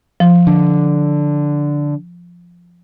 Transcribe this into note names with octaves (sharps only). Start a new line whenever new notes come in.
F3
D3